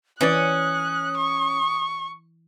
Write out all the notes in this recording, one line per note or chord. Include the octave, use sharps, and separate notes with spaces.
E3 C#4 D5 D#6 F#6
C#6